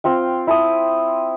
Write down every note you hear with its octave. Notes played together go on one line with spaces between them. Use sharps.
C4 F4 G5
E4 A5 D#6